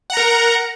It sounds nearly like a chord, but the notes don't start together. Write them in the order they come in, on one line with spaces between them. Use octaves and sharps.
F#5 A#5 A#4